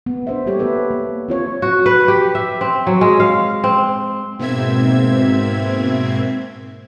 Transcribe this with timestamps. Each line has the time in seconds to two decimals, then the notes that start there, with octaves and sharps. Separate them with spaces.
0.06 B3
0.27 D4 C5 E5
0.46 G3 A#3 G4 A4 C#5
0.59 B3 A4 B4 E5
0.91 A#3
1.29 C4 F4 C#5
1.62 F#4
1.86 B4
2.08 G4
2.35 E5
2.61 C4
2.87 F#3
3.01 G#3
3.20 F5
3.64 C4
4.39 G#2 B2 A#3 C4 E5 G#6